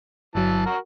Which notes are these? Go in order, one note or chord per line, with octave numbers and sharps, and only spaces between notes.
G1 E3 F#3 A5
F#4 A#4